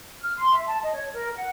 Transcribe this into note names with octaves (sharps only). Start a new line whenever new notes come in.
F6
C6
E5
A5
D#5
C#5
A#4
F#5